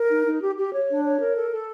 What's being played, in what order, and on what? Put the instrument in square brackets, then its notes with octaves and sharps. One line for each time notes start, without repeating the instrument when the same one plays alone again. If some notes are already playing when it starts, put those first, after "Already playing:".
Already playing: [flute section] A#4
D#4
D#4
G4
G4
C#5
D4
C#5
A#4
A4
A4